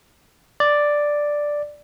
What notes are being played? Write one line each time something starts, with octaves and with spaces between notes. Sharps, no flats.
D5